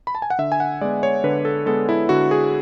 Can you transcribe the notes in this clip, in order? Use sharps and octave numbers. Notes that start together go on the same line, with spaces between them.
B5
A5
G#5
F#5
D3 E5
G#5
F#5
G#3 B3 D5
C#5
D3 B4
A4
G#3 B3 A4
E4
D3 F#4
G#4